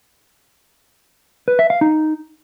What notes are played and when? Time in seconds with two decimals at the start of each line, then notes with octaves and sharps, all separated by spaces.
1.48 B4
1.59 E5
1.70 F5
1.81 D#4